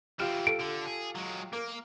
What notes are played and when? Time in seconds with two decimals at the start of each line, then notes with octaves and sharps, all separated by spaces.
0.20 E3 C4 F4 G4 F6 D7 E7
0.47 A4 D7
0.60 D3
0.87 G#4
1.16 F#3 G#3
1.53 A#3 A#4